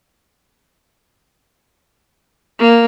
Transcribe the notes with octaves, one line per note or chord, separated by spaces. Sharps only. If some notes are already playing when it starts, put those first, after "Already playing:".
A#3